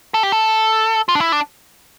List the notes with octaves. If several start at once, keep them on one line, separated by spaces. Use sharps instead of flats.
A4
G4
A4
F4
D4
E4
D4